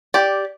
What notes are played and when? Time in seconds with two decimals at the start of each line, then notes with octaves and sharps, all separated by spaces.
0.14 G4 D5